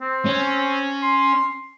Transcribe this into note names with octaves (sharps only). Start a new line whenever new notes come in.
C4
C#4
C6